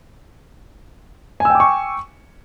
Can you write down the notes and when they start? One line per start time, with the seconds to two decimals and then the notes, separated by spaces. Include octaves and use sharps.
1.40 G#5
1.45 E6
1.50 G5
1.55 D6
1.60 C#6